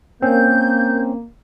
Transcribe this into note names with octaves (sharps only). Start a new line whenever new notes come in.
A#3 C4 C#4 G6